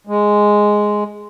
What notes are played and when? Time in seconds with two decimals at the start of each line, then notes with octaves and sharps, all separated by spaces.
0.07 G#3